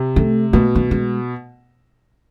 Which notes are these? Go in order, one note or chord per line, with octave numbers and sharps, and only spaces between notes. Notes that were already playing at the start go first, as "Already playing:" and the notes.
Already playing: C3
A3
B2 A#3
A#3
G#3